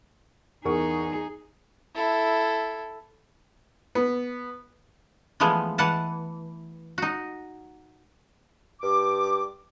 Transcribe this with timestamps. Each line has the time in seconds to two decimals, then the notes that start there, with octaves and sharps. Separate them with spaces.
0.65 E2 D#4 G#4 A#4 C#6
1.95 E4 A4
3.95 B3
5.40 E3 F3 G#3 A3 B3
5.78 E3 B4 F#5 A5
6.98 D#4 F#4
8.81 G2 D6